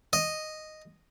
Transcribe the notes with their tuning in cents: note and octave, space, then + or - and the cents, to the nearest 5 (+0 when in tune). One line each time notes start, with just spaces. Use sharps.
D#5 -5